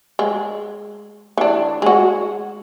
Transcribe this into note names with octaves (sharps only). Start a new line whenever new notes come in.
G#3
E3 D4
G#3 F#4